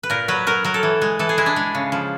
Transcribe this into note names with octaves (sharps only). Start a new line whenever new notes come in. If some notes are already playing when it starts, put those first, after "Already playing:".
B4
A#2 A#4
F#3 B4
F#3 A#4
F#3 A#4
A4
E3
G#3
E3 A4
G#4
G#3 E4
D4
G#3
C#3
F3